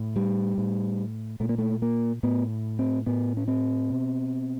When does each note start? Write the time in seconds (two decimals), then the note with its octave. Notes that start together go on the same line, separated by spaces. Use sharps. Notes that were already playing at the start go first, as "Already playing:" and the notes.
Already playing: A2
0.16 G3
0.58 A2
1.40 A#2 A3
1.49 A#3
1.58 A3
1.82 A#3
2.23 A2 B3
2.79 C4
3.06 A2 B3
3.37 C#4
3.48 C4
3.90 B2